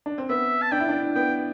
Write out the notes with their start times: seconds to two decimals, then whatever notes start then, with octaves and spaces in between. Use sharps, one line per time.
0.06 D4
0.18 C4
0.29 B3 E5
0.62 A5
0.72 D4 G5
0.80 E4
0.89 D4
1.15 B3 G5